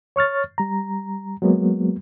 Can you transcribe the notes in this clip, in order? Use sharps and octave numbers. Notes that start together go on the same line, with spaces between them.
C#5 C#6 F6 A6
G3 A#5
F#3 G#3 A#3 B3